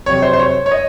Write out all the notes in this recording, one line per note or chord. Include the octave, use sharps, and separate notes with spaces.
F2 C3 F#3 C#5
C5
C5
C#5
C#5
D#5